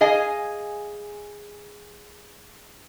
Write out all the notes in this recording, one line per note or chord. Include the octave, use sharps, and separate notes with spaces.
G#4 D#5 F5 G#5